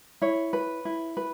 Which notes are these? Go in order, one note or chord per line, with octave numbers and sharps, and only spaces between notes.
E4 C#5
B4
E4
B4